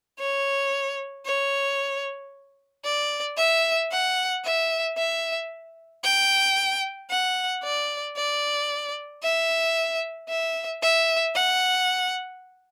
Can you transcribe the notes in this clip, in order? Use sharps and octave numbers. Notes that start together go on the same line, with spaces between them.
C#5
C#5
D5
E5
F#5
E5
E5
G5
F#5
D5
D5
E5
E5
E5
F#5